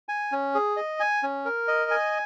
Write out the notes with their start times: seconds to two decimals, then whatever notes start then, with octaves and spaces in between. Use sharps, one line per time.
0.09 G#5
0.32 C#4
0.55 G#4
0.77 D#5
1.00 G#5
1.23 C#4
1.45 A#4
1.68 D#5
1.91 G#5